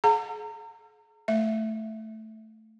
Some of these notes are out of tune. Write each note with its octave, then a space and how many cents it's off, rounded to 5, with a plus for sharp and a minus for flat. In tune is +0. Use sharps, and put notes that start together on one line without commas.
G#4 +30 F#5 -30 A#5 -35
A3 +0 E5 +0